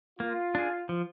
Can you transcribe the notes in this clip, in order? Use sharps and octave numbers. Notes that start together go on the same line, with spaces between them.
A#3 F4
D4 G#4
F3